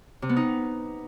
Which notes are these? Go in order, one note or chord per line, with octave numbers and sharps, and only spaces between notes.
C3
B3
D#4